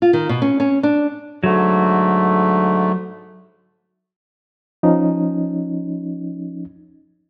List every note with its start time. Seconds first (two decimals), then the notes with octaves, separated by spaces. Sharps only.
0.02 F4
0.13 D#3
0.29 B2
0.42 C#4
0.60 C#4
0.83 D4
1.44 G#2 D3 F#3 A3
4.83 F3 C#4 D#4